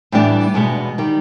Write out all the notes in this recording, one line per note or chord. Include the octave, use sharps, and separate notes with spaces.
A2 E3 G3 B3 D4
E2 B2 G#3 B3
D#3 G3